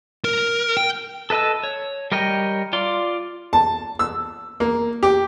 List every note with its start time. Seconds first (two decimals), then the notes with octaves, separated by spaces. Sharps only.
0.25 A#4
0.77 G5
1.30 A4 B4 D#5 A5 E6
1.64 C#5
2.12 G3 A#4 C#5 D#5 G5
2.73 F4 D5 C6
3.53 A5
3.99 E6
4.60 A#3
5.03 G4